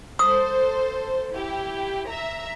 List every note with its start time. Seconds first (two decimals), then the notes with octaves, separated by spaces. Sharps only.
0.19 A4 C5 D#6
1.32 E4 G4
2.08 E5 A#5